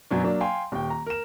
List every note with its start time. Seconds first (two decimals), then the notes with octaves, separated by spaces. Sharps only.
0.10 F#2 B2 F#3 D4
0.23 F#3 A#3 D4
0.40 F5 G5 G#5 C6
0.72 D#1 G5
0.90 A#5
1.06 A#4 E7